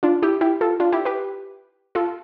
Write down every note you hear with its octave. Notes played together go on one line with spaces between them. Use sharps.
D4 F4
E4 G4
E4 G4
F4 A4
D4 F4
E4 G4
G4 B4
F4 A4